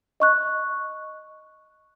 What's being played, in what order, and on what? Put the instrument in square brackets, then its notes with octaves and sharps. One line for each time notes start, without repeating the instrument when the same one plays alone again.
[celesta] D#5 C#6 F#6